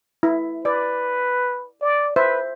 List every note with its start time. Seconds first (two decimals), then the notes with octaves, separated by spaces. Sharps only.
0.23 E4
0.65 B4 D5
1.81 D5
2.16 B4 C5 E5